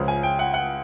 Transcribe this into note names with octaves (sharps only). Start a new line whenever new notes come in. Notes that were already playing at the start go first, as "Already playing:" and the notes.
Already playing: C#2 C#3 F3
G#5
G5
F#5
F#5